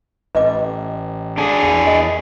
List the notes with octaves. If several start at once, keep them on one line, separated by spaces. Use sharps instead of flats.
A1 B4 D#5 D6
D4 G#4 A4
E2
E2 D#5